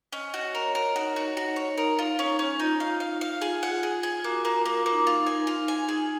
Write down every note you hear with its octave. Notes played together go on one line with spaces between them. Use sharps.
C#4 D#5
F#4
A#4 C#5
A#4
D#4 F#4
F#4
F#4
C#5
D#4 A#4
F4
C#4 D#4
C#4
D#4 F4
F5
F5
F5
F4 G#4
F#5
G#4
G#4
F4
A#3 F#4
A#3
F4
A#3
F4
A#3
D#4
F4
D#4
G#5
F4
G#5
D#4 G#4